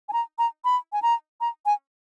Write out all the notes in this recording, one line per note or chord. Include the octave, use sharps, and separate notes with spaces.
G#5
A#5
A#5
B5
G#5
A#5
A#5
G#5